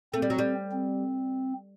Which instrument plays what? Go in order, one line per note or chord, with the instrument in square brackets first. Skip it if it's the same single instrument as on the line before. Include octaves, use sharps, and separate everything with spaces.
[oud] A3 [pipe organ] C4
[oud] G3
F#3
G3
[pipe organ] C4